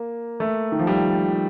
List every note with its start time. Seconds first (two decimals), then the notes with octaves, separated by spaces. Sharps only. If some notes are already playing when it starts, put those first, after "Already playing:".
Already playing: A#3
0.40 A3
0.72 D#3
0.79 F3
0.87 G3